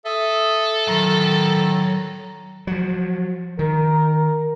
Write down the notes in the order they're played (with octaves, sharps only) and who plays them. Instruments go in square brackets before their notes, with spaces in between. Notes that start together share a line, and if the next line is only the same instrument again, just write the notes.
[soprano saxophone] A4 [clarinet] E5 [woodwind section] D#6
[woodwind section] A2 D3 D#3 [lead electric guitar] F#3 C6 [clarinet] A#5
[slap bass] F3 F#3
[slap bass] D#3 [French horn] A#4